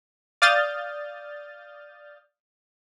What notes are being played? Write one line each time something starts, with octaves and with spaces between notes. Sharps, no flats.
D5 F5 D#6 F6 G6 A6